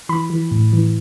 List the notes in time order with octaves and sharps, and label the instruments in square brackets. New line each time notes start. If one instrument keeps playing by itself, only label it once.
[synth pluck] E3 B5
E3
A2
E3